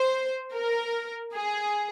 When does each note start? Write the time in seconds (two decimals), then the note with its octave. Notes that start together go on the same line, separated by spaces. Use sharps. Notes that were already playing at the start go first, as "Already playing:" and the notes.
Already playing: C5
0.53 A#4
1.34 G#4